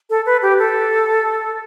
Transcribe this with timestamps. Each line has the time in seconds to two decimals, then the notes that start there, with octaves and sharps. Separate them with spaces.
0.10 A4
0.26 B4
0.42 G4
0.59 A4